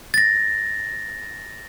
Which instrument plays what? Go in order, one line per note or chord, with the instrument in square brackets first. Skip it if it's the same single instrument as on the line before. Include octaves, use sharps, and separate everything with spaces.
[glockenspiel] A6 A#6